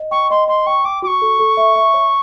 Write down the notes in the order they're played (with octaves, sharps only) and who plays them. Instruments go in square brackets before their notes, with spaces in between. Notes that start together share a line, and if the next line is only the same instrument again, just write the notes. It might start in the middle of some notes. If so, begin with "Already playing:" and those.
Already playing: [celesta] D#5
[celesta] G5 [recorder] C#6
[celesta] D#5 [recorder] C6
[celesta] D#5 [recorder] C6
[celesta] G5 [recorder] C#6
[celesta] G5 [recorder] D6
[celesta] F#4 [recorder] D6
[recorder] C#6
[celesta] A4
A4
E5
E5
C#5